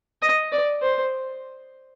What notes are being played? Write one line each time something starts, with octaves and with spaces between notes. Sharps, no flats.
D#5
D5
C5